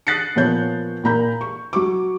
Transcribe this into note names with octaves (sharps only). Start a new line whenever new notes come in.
D#6 F#6 A6 C7 C#7
A#2 F3 B3 C#5 G6
A#2 A#3 A#5 B5 G6
C#6
F#3 C#6 D6